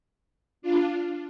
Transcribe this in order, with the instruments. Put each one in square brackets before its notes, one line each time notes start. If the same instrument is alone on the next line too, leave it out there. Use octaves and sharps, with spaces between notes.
[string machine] D4 F4